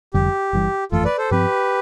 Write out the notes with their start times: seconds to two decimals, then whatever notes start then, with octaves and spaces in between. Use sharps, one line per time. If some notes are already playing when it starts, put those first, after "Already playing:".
0.14 F1 F2 D3 G3 G4
0.53 G1 G2 E3 G3
0.92 G1 F2 E3 A3 F4 A4
1.05 B4 D5
1.18 A4 C5
1.31 G2 F3 C4 G4 B4